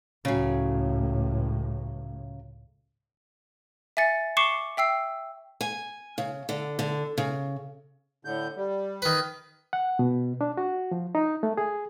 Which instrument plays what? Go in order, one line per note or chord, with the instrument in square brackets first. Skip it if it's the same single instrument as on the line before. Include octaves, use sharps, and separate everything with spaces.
[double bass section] C#2 A2 [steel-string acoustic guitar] C#3 F#3
[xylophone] E5 G#5 A6 C#7
C#6 D6 C7 C#7 E7 G7
E5 G5 E6 C7
[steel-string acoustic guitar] G#5
C#3
D3
D3
C#3
[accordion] A2 D3 G6
G3
[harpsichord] D#3 B4
[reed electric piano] F#5
B2
D4
F#4
F3
D#4
A3
G#4